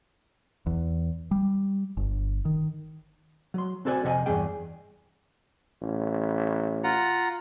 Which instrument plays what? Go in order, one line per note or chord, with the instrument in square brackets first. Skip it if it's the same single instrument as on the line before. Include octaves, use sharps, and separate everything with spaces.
[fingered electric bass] E2
G3
G1
D#3
[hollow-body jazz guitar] F#3 C6
C4 F#4 A4 D5 G#5
F2 C3 F#4 D#5 G#5
E2 G2 G#4 G5
[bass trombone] A1
[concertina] F4 F#5 A#5